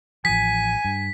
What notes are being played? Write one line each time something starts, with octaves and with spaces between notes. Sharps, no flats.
A1 F3 G#5 B6
G2